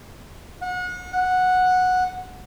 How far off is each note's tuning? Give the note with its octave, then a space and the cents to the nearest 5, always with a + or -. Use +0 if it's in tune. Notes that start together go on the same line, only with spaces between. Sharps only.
F#5 -35
F#5 -10